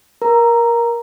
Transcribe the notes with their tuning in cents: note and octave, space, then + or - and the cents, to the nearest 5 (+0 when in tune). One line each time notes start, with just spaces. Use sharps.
A#4 +15 A#5 +0